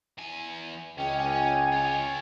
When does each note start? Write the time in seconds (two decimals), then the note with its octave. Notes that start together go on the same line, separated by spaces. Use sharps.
0.18 E2 G#5
0.98 C#2 C#4 G5 G#5
1.72 F4 C#5